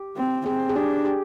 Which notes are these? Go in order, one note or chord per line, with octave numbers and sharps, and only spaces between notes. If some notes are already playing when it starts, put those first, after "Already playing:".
Already playing: G4
C4
C4 G#4
G#4
D4 G4
G4